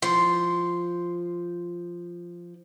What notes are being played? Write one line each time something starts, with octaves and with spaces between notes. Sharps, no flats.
F3 C6